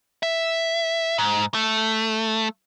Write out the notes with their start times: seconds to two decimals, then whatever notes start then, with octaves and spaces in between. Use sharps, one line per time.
0.23 E5
1.18 G#2
1.54 A3